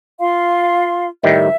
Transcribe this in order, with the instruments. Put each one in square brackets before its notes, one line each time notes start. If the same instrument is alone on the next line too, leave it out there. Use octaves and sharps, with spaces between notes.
[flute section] F4 F5 C6
[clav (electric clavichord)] A2 D#3 G3 [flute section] E5